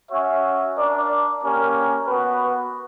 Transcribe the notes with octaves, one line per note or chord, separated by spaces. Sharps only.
C#4 F#4 C#5 E5
D4 A#4 D5
A#3 C#4 G4 A#4
B3 F#4 B4